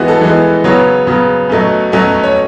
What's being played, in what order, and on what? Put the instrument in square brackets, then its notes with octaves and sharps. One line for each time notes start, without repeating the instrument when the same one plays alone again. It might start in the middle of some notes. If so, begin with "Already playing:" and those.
Already playing: [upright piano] E3 G#3 B3 F#4
A4
E3 G#3 B3
C#3 F#3 B3 C#5
C#3 F#3 B3
B2 F#3 A3 C#4
B2 F#3 A3 C#4
C#5